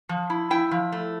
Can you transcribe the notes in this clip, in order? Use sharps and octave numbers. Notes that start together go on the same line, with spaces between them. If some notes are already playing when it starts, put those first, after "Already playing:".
F3
E4
E4 G5
F3
A3